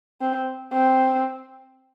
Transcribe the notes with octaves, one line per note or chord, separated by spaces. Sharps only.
C4
C4